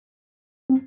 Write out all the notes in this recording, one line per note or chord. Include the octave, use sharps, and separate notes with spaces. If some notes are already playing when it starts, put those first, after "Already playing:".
C4